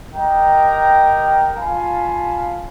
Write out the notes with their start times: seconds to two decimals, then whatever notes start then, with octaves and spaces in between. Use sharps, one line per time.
0.15 G4 A#4 D#5 G5 A#5
1.57 F4 F5 G#5 A5 B5